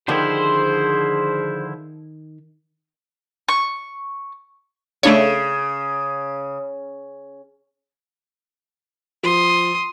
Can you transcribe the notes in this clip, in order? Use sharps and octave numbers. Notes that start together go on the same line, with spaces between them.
D3 D#3 F3 E4 G4 G#4 C5
C#6
C#3 A3 D4 C#5
F3 C6 D#6